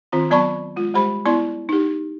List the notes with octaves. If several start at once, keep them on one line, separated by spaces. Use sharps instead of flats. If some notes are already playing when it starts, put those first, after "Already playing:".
D#3 C4 F4 C6
F#3 B3 D5 A5 B5 C#6
G#3 F4
G3 G#3 G4 C5 B5
B3 E4 D5 C6
D#4 G4